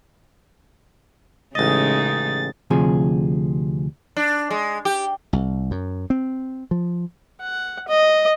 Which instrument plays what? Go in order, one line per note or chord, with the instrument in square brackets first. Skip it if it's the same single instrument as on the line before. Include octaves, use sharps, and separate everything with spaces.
[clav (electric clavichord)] A1 D#5 [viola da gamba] C#3 G#3 D#4 [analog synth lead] A6
[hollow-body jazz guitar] D2 C3 F3 G#4
[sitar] D4
G#3
G4
[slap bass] C2
F#2
C4
F3
[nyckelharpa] F#5
D#5